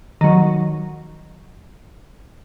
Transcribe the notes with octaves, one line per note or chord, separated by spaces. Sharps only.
D#3 F#3